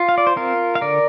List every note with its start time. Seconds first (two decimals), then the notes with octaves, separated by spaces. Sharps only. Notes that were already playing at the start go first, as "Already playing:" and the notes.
Already playing: F4
0.09 F5
0.18 D5
0.27 C5
0.36 C4 F4 A#4
0.75 F5
0.81 D3 A#4 D5